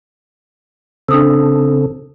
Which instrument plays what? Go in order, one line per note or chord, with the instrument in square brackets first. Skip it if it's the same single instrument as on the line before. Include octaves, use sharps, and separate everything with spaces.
[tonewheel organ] C#3 C4 A4 [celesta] D4 D#6 E6